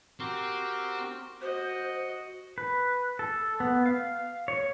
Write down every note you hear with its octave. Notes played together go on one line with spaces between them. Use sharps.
C4 F#4 G4 A#4
F#4 C5 D#5
B4
A4
B3
F5
C#5